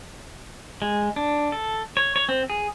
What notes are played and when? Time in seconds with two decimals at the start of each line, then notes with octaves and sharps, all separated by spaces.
0.82 G#3
1.16 D4
1.52 A4
1.97 C#5
2.16 C#5
2.29 C4
2.50 G#4